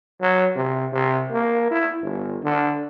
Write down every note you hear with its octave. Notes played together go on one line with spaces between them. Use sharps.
F#3
C3
C3
A#3
E4
G1
D3